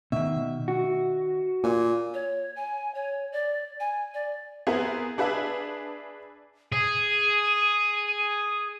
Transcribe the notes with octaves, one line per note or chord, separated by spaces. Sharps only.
B2 D#3 E5
F#4
A#2 G#5
C#5
G#5
C#5
D5
G#5
D5
B3 C4 E4 G#4 A#4
D4 G#4 B4 E5 A5
G#4 D#7